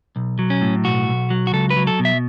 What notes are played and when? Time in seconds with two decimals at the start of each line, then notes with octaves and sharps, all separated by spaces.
0.16 B1
0.39 F#3
0.50 C#4
0.61 A2
0.84 B1 F#4
1.07 B1
1.30 F#3
1.47 F#4
1.53 C#2 A4
1.70 B4
1.77 F#3
1.87 A4
1.99 B2
2.05 E5